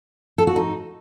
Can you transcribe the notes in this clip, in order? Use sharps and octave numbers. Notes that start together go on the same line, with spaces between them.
A4
F#4
D#4